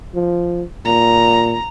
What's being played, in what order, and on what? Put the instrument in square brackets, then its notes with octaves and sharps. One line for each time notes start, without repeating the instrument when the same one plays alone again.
[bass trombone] F3
[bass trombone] A#2 [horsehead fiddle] A#5